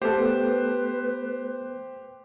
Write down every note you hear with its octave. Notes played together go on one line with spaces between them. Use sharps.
A3 B3 G4 A4 B4 C5